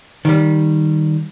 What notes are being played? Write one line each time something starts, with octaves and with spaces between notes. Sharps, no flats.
D#3 G3